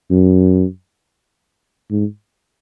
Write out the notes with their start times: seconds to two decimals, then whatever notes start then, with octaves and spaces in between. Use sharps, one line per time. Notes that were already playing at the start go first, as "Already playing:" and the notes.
0.10 F#2
1.91 G#2